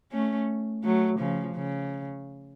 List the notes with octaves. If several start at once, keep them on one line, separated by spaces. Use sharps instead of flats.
A3 C#4
F#3 A3
C#3 F3
C#3